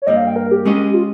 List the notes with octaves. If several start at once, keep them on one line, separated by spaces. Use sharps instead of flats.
C#5
G2 G3 A#3 D#5
F5
G5
A#4
G4
G#3 C#4 G#4 D#5
F4